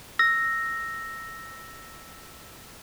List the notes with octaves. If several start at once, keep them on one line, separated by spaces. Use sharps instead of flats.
E6 A#6